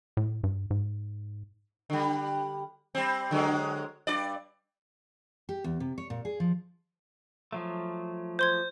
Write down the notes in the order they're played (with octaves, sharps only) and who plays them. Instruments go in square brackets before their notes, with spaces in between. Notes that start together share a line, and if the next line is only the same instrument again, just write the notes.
[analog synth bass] A2
G2
G#2
[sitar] D3 G3
G3 C4
D3 F#3 G#3
G2 F4 D5
[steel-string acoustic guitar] G4
E2
C3
C#5
A#2
G#4
F3
[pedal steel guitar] F3 F#3 A3
[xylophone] C5 C6 G#6 [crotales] G6